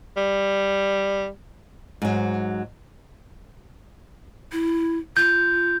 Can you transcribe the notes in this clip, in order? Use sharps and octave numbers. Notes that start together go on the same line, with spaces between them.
G3
G#2 F#3
E4
F4 G6